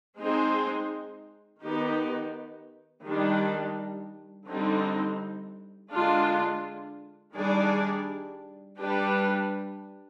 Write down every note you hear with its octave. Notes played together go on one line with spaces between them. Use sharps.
G#3 C4 D#4 G#4 C5
D#3 B3 D#4 G4
D#3 G3 D4
D3 G3 C4 D#4
D3 G#3 D4 F4
D#3 G3 D4 G#4 D5
G3 D4 G4 B4